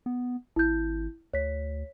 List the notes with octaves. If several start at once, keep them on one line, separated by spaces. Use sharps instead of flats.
B3
G#1 E4 G6
D2 C#5 B6